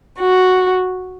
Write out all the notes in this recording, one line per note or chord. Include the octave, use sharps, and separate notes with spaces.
F#4